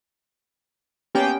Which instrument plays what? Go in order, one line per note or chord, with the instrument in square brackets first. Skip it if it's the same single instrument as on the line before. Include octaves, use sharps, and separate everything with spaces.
[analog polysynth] A#3 B3 G5 [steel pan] C#4 G4